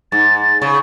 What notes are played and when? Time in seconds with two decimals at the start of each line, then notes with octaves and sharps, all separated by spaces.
0.12 G#2 A6
0.62 C#3